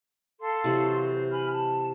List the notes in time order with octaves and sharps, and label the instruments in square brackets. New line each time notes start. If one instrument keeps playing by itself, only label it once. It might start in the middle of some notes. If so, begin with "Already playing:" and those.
[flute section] A4 F5 C6
[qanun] C3 E3 F#3
[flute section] C5
G#5 B5 F6
A5